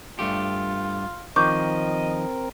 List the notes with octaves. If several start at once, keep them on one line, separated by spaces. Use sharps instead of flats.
G2 A3 F4 G4
D#3 F3 C4 A#4 D#5 C#6 D6 G6